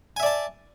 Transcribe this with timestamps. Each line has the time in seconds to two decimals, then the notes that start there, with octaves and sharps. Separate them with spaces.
0.16 G#5
0.20 E5
0.23 D5
0.26 A5